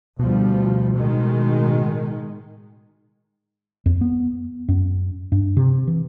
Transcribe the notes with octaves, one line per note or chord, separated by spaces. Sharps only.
D2 B2 F3 G3
A2 D#3 G#3
F2
B3
F#2
G2
C3
E3